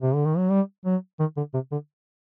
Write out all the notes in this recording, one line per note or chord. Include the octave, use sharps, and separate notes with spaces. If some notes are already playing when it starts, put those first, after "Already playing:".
C3
D3
D#3
F#3
G3
F#3
D#3
D3
C3
D3